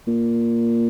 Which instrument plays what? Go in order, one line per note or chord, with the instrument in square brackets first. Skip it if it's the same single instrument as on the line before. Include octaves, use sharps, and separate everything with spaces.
[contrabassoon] A#2